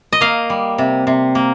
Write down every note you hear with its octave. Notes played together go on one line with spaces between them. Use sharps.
D#5
A#3 F5
G3
C3
C3
A#3